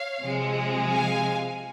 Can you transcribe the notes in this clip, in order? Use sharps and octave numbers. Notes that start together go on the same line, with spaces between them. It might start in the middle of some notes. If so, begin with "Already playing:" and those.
Already playing: C#5 F5
C3 F3 G#3
F5 G#5